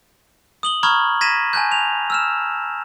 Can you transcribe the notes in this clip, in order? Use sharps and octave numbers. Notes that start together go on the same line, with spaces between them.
D#6 F#7 G7
A#5 B5 C#6 D#6 F6 G#6
G#6 A#6 B6 D#7 E7
G#5 A5 F#6 G6
F7
E6 F6 E7